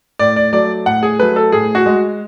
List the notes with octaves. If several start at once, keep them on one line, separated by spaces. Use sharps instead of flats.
A2 D5
D5
F#3 A3 D5
A2 F#5
G#4
F#3 A3 B4
A4
A2 G#4
F#4
G#3